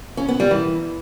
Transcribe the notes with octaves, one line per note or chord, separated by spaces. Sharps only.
C#4
B3
G3
E3